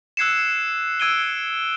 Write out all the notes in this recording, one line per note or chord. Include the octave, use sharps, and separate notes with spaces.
E6 F#6 G#6 C7 C#7 E7
E6 G#6 D7 D#7 G7